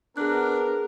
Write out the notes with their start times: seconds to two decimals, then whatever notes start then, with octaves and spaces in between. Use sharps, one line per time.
0.17 B3 D4 G#4 A#4 F#6